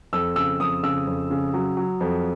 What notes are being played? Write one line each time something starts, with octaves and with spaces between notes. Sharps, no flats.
F2 E6
C#3 E6
F2 D#6
C#3 E6
F2
C#3
F#3
F#3
F2